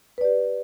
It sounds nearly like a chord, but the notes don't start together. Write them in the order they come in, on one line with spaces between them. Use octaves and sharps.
B4 D5 G4